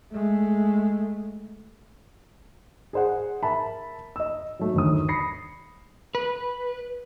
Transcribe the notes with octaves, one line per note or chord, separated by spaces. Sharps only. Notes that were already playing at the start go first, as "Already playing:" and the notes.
G#3 A3
G#4 C5 F#5
A#4 E5 A5 B5
D#5 E6
F#3 A3 F#4
G1 D#2 D#6
B5 A#6 C7 C#7
B4